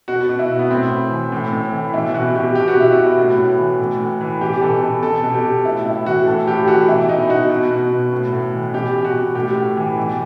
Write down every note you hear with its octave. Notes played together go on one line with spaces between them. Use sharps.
B2 F#4
B2
E4
B2
B3
A2 C4
A2
E3
A2
A2
E3
B2 E4
B2 F#4
B2 G4
B2 G4
F#4
B2 E4
B2 F#4
A2
A2
E3
A2
A2
E3
B2 G4
B2 A4
B2
B2 A4
B2
G4
B2
A2 E4
A2 E4
E3 F#4
A2 A4
A2 G4
E3 F#4
B2 E4
B2 D#4
B2 F#4
B2
B2
B2
A2
A2
E3
B2 G4
B2
F#4
B2
A2 G4
A2
E3
B2